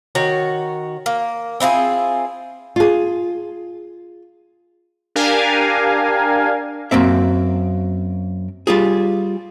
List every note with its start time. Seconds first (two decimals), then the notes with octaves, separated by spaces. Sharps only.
0.15 D#3 F#4 C#5
1.06 A#3
1.60 C4 E4 F4 G#4
2.76 F4 G#4
5.16 D4 G4 A#4 F5 G#5
6.91 F#2 A#3 C4 E5
8.67 G3 F4 G#4